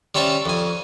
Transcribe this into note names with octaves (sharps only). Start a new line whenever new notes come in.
G3 C4 C#4 E5 A5
F2 G#5